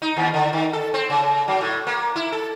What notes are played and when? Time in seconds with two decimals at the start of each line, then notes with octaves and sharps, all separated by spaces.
0.02 D#4
0.17 D#2
0.34 D3
0.53 D#3
0.73 A4
0.94 C4
1.10 C#3
1.48 F#3
1.61 A2
1.87 A#3
2.16 E4
2.32 A4